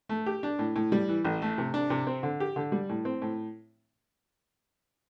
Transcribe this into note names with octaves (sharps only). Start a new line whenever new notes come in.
A3
G4
D4
A2
A2
G3
E3
A1
A3
C3
D4
C3
C4
D3
G4
D3
G3
A2
C4
A2